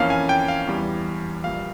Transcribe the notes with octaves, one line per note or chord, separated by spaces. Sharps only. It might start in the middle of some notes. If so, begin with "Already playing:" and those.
Already playing: F2 E3 A#3 C#4 F5
G#5
G5
F5
E2 E3 G3
A#1 A#2 G3 F5